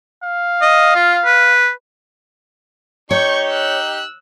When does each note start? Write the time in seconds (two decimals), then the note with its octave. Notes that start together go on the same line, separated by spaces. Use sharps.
0.23 F5
0.62 D#5
0.95 F4
1.25 B4
3.11 D#4 G4 C#5 C#6 G6
3.49 E6 F#6